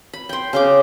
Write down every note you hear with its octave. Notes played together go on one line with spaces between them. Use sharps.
B5
G5 C6
C#3 G5 D6